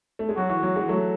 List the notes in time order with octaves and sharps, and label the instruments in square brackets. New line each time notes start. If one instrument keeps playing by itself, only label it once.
[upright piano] A3
G#3
[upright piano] F#3 [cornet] F#4
[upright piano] E3
F#3
E3 G#3
F#3 A3